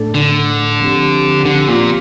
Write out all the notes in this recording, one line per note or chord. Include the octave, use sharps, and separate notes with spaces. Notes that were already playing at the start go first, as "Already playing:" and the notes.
Already playing: A2 A3 D4 A4
D3
F3 C4 G4
D3
A#2